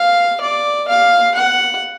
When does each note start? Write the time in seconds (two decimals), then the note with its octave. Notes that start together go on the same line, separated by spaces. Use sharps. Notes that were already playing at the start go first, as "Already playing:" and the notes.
Already playing: F5
0.41 D5
0.88 F5
1.35 F#5